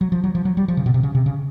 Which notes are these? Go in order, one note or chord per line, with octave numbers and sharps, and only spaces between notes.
F#3
F3
F#3
F3
F#3
G3
F3
C#3
B2
C3
C#3
C3
C#3